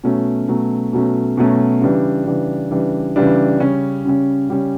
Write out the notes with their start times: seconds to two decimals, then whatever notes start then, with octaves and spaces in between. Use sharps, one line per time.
0.04 B2 F#3 A3 C#4
0.48 B2 F#3 A3 C#4
0.93 B2 F#3 A3 C#4
1.38 B2 F#3 A3 C#4
1.82 C#3 E3 G3 D4
2.26 C#3 E3 G3 D4
2.71 C#3 E3 G3 D4
3.16 C#3 E3 G3 D4
3.60 C#3 G3 C#4
4.05 C#3 G3 C#4
4.49 C#3 G3 C#4